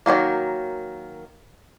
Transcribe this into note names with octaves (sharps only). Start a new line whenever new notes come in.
D#3 E3 F#3 A#3